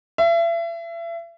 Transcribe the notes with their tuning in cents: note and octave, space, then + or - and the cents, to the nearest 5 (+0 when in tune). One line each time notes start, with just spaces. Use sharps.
E5 +35